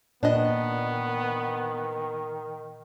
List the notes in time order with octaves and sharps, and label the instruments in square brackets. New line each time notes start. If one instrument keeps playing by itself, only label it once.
[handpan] A#2 [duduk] D#3 [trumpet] B3 [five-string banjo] D4 D#5